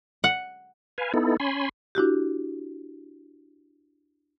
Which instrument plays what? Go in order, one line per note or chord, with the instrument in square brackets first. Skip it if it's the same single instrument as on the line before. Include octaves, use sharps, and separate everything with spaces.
[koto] F#5
[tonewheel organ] B4 F5 G#5
B3 D#4 E4 A4
C#4 G#5 B5 C6
[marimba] D4 E4 F#4 G4